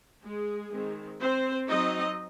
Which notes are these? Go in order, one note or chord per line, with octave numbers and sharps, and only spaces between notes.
G#3 G#4
D#3 G#3 C4
C4 C5
F#3 C4 D#4 D#5